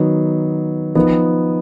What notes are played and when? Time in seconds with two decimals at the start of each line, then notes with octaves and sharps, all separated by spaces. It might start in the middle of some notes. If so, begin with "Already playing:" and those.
Already playing: D#3 F#3 B3 D#4
0.95 F3 B3 D#4